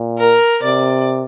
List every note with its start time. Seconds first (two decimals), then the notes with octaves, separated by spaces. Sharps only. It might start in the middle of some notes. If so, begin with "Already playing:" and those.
Already playing: A#2
0.18 A#4
0.63 C3 D5